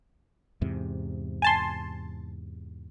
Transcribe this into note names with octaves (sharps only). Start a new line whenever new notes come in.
E2 G#2 C3
G#5 A5 C6